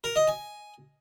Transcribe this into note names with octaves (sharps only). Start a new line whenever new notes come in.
A#4
D#5
G#5